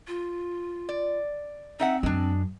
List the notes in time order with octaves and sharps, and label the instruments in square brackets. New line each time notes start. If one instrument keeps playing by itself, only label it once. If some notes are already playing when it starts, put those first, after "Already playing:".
[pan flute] F4
[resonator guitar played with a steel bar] D5
[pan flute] C4 [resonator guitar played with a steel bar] D#4 E5 F#5
[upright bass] F#2 [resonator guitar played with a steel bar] G#3 D4